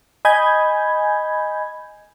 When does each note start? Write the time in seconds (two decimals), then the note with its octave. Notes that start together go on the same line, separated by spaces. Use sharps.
0.25 D#5 G#5 B5 G6 G#6